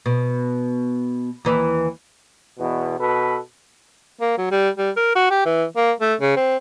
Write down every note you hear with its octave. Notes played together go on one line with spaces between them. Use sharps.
B2
D#2 E3 E5
E2 B2
B2 A4 B4
A#3
F#3
G3
G3
A#4
F#4
G4
E3
A#3
A3
C#3
C4